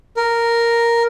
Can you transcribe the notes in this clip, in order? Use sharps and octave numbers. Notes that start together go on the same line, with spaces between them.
A#4